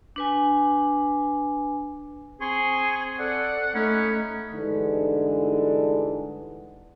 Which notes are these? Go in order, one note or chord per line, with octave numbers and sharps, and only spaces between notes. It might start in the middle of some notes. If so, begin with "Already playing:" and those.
D4 B4 G#5
C4 G#4 G#5 C6 C#6
A4 D5 F#5
A3 C#4 D#4 B5
G2 D3 E3 G#3 D#4